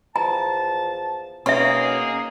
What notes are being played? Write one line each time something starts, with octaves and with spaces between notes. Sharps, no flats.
E2 F3 A5 A#5
B2 A#3 C#4 D#4 G#4 E5 C#6